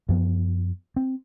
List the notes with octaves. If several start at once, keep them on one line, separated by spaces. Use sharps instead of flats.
F#2 F3 B3
C4